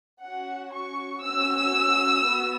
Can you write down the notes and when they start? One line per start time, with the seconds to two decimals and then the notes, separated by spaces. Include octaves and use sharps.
0.23 C#4 F#4 F#5
0.74 C#6
1.23 C#4 F#4 E6
2.25 B3 F#4